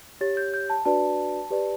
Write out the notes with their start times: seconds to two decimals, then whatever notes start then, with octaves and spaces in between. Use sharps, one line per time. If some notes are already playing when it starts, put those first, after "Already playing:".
0.21 G4 C#5 A6
0.37 G6
0.54 G6
0.70 A5
0.85 D4 F#4 B4 D5 A5
1.50 G4 B4 D5